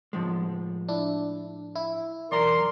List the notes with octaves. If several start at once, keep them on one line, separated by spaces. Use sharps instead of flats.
A2 F3 G#3
D4 E4
E4
B1 E2 A#4 D5 A#5 C6